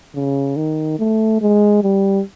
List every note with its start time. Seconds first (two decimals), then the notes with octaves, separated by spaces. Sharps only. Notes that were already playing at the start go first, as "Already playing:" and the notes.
0.15 C#3
0.56 D#3
0.99 A3
1.41 G#3
1.83 G3